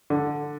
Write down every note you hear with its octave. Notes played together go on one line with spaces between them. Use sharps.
D3